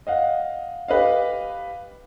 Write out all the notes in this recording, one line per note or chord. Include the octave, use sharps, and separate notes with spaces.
D#5 F5 F#5
G4 B4 D#5 F5